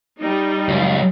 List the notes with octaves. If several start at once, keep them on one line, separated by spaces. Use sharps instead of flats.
G3 D#4
C#2 F#2